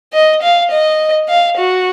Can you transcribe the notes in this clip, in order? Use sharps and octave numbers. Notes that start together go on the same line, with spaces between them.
D#5
F5
D#5
F5
F#4